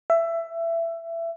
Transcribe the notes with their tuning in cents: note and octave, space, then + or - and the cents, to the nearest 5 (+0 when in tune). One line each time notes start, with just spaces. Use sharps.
E5 +15